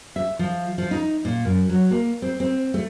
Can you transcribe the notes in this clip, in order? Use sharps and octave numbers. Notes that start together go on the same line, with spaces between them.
E5
F3
F3
D#4
A#2
F#2
F#3
A#3
C4
C4
A3